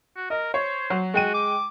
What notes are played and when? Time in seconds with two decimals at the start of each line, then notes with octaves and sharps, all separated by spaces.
0.16 F#4
0.30 A#4 D#5
0.54 C5 C#5
0.90 F#3
1.14 G#3 F#4 G5 D#7
1.34 D6